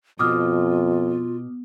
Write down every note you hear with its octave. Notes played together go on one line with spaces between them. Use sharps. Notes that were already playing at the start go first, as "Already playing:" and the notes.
F2 B2 F4 D6 D#6 F6